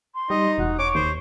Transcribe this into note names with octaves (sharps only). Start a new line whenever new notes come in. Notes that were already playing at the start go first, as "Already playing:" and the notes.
C6
G3 D#4 D#5
E1 F#4
C#5 C#6 D6
D#2 C5